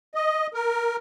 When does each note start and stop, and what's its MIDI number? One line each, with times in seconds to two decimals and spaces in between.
0.15 0.47 75
0.54 0.96 70